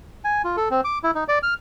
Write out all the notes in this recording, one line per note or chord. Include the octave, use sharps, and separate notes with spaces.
G#5
F4
A4
C4
D6
E4
D#4
D5
F6